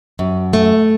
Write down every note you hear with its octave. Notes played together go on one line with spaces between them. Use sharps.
F#2
A3